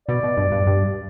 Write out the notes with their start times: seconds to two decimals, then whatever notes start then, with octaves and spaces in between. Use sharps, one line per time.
0.08 B2 D5
0.24 B2
0.37 G2
0.52 G2
0.67 G2